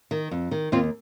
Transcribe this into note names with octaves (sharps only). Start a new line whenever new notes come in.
D#3
F2
D#3
D#2 C4 F4